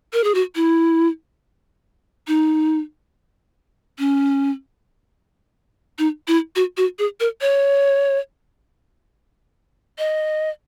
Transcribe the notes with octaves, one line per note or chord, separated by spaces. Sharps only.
A#4
G#4
F#4
E4
D#4
C#4
D#4
E4
F#4
F#4
G#4
A#4
C#5
D#5